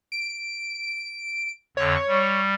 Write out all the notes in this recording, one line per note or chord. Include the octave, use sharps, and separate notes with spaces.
D7
F2 D3 C#5
G3